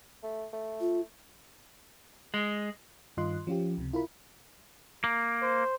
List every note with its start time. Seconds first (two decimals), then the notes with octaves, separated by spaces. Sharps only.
0.23 A3
0.53 A3
0.80 F4
2.34 G#3
3.17 G2 D#3 F4 D#5 C6 F#6
3.47 F3 C#4 F4 G4
3.78 C#2 C3
3.93 E4 F4 A#4 B5
5.04 A#3
5.42 C5